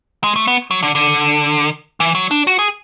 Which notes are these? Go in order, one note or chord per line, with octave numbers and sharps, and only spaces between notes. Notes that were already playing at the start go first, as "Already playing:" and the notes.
G#3
A3
B3
F#3
D3
D3
E3
F#3
D4
F#4
G#4